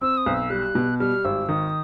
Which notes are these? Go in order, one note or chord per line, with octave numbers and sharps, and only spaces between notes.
C4 E6
D#6
B1
E6
G3 F#6
B2
G3 F6
G#1 E6
D#3 D#6